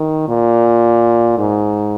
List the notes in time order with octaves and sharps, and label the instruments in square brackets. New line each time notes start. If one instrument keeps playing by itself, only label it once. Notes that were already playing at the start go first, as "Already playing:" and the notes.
Already playing: [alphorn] D#3
A#2
G#2